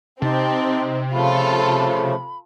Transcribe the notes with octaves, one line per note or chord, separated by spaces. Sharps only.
C3 C4 D#4 G4 A5
C#3 F3 A3 F4 A4 B5